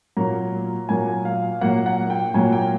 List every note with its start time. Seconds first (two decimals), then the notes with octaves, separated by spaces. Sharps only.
0.17 A#2 F#3 A#3 A#5
0.89 A#2 F#3 A#3 G#5
1.25 F5
1.61 A#2 F#3 A#3 F#5
1.86 F#5
2.10 G5
2.34 A#2 F#3 A#3 G#5
2.52 G5